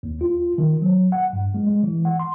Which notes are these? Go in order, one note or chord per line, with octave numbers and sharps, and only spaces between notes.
D#2
F4
D#3
F#3
F#5
G2
G#3
G#3
E3
F#5
C6